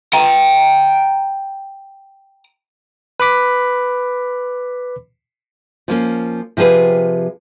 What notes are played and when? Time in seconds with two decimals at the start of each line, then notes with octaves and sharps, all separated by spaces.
0.13 G5 A#5
3.20 B4 B5 D6 B6
5.88 F3 A#3 C#4
6.57 C3 F3 G4 G#4 B4